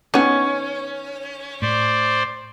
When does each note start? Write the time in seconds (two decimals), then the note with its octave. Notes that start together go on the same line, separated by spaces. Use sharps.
0.14 D#3 B3 C#4
1.62 A2 C5 D5